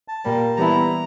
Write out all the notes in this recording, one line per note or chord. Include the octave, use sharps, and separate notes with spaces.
A5
A#2 G3 A#3
E3 G3 B3 E4 A#5